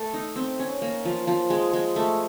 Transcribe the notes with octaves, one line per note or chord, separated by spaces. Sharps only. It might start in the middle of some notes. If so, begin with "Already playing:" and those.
Already playing: A3 A4
D#4
C4
C#4
A#3
F3
F3
G#3
G#3
A3